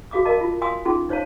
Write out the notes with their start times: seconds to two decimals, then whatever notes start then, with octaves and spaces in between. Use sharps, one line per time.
0.11 F#4 G#4 F5 D6 D#6
0.25 A#4 D#5 F5 A5
0.41 F4
0.62 F5 G#5 C6 D#6 E6
0.85 C#4 D#4 F4 G#4 C6
1.09 D#4 C5 C#5 F5 A5